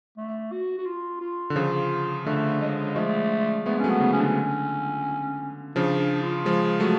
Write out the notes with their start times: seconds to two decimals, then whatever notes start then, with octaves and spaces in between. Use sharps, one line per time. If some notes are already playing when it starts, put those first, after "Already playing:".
0.17 A3
0.52 F#4
0.78 F#4
0.86 F4
1.21 F4
1.50 D3
1.56 C#3 F3 F4
2.26 D3 A3
2.61 G#3
2.96 F3 G#3 A3
3.66 G#3 A3 B3
3.79 C#4
3.84 F#3 A3
3.90 B3
4.00 C#3
4.13 C#4
4.18 D3 D4
4.27 C#4
5.75 C#3 F3 D4
5.99 D4
6.22 F4
6.45 F3 G#3
6.80 F#3 A3